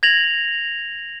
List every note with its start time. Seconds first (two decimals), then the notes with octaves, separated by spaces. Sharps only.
0.03 G#6 A#6 F7 F#7